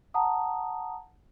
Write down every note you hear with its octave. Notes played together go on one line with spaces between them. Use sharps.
F#5 A5 A#5 D#6